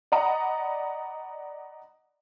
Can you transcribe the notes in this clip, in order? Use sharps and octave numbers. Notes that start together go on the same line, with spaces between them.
D5 D#5 F#5 A#5 B5 D#6